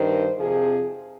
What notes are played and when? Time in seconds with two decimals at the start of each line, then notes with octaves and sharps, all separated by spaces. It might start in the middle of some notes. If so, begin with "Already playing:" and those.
Already playing: G2 D#3 C5
0.38 F2 C3 F3 G#4